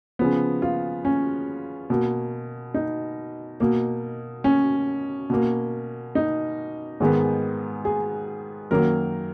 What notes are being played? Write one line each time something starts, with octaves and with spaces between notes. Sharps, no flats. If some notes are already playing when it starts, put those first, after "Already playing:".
C#3 F3 B3
F4
C#4
B2 A#3
D#4
B2 A#3
C#4
B2 A#3
D#4
G#2 D#3 G#3 B3
G#4
F#2 D#3 F#3 A#3 A#4